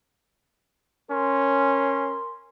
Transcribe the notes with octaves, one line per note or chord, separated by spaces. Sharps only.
C#4 A#4 C6